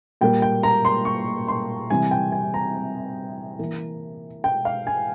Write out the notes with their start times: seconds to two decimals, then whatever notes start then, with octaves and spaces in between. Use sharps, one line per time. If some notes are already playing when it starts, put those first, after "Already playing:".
0.21 A#2 G3 A#3 G5
0.42 G5
0.63 A#5
0.85 C6
1.05 C#6
1.48 C6
1.90 C3 E3 G3 G#5
2.11 G5
2.32 G#5
2.54 A#5
3.59 E3 A#3
4.44 G5
4.65 F5
4.87 G#5